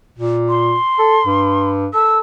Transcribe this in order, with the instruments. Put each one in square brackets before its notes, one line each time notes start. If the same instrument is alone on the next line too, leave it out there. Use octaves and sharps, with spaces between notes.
[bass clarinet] A#2
[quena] C6
[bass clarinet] A4
G2
[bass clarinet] A4 [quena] E6